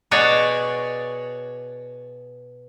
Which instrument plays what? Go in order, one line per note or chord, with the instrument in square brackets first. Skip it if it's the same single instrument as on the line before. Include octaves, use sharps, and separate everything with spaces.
[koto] B2 F#4 G#4 C#5 D5